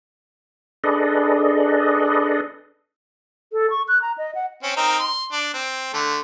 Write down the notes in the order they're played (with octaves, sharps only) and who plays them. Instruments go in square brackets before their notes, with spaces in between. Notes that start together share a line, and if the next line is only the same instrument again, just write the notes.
[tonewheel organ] D4 G#4 A4 B4 D5 D#5
[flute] A4
C#6
F#6
A#5
D#5
F#5
[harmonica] C4 C#4
C4 D#4 A#4
C6
D4
C4
D3 A3